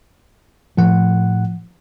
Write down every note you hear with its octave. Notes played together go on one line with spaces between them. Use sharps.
A2 F3 F#5